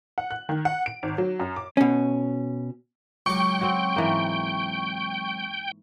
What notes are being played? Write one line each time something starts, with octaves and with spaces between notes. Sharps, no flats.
F#5
F#6
D#3
F#5
D7
G#1
F#3
F#2
D6
B2 C#4
C#2 F#3 G5 C#6 D6
C4 F#4 C#5
G#2 E3 A#3